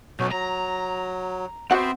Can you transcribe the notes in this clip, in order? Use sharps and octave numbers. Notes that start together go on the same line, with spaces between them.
B1 F#3 C#4 F#4
F#3 A#5
B3 C4 F#4 C5 E5 F#5